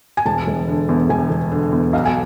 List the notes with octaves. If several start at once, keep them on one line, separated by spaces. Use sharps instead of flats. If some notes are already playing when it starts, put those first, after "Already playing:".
G#5
E1 A5
E1
D3
E2
E1 G#5
E1
D3
E2
B1 F5
G#5